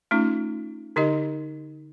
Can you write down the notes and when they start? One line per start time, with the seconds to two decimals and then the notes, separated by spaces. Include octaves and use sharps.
0.11 A3 C#4 D#4 F4
0.96 D3 D#4 G4 D#5